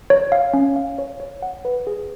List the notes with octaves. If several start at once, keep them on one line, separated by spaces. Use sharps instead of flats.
C#5
F5
C#4
F5
C#5
C#5
F#5
B4
G#4